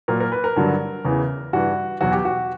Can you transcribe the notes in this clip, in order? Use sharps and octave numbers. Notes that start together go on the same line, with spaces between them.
A#2 F#3 A#4
A#4
B4
A#4
G2 D3 F#3
E2 C#3 E3
G2 E3 F#4
E2 B2 F#3 F#4
G4
F#4